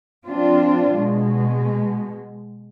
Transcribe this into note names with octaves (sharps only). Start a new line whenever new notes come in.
F3 C4 D4 F4
B2 G#3